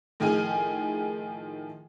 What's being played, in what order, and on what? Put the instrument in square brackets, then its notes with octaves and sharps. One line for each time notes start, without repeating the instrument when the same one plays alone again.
[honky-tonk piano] A2 D#3 F3 G#4 G#5 F6